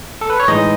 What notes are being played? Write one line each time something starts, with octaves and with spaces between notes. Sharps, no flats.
A4
B4
C#5
A2 E3 G#3 D#4 D#5